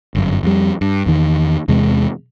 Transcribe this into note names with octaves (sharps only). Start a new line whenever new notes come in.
G1 F#2
F2 G3
G2
E2 D#3
E2 C3 E3 G#3